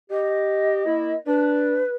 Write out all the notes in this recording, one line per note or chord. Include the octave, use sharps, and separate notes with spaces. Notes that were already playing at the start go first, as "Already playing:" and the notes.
G4 D#5
A#3 E4
D4 B4